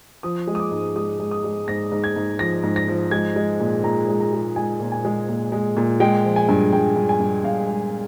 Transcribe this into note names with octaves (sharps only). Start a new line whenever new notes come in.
F3 D#6
G#3
D#6
D6
G#2
G#3 D#6
G#3
D#6
G#3
G#2 A#6
G#2
G#6
G#2
F3 A#6
G#2
A#6
F3
G#3 G#6
G#3
A#2
A#2 A#5
G#3
A#5
G#3
G#3 G#5
A#2
G#5
G#3
A#2
G#3
A#2
G#3 G5
F3
G#5
G2
G2 G5
G2
G#5
G2
G2 F5
G#3